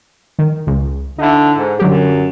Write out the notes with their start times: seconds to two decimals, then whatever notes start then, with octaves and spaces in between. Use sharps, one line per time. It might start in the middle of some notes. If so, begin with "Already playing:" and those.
0.39 D#3
0.67 C#2
1.18 D3 D#4 E4
1.57 G#2
1.79 F#2 D3 F#3 G4